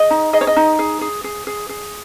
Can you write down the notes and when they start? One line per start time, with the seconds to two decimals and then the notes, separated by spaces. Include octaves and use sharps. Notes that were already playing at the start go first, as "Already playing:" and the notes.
Already playing: G#4 D#5
0.10 D#4
0.33 G#4 D#5
0.41 C#5
0.47 D#5
0.56 D#4
0.79 G#4
1.01 G#4
1.24 G#4
1.47 G#4
1.69 G#4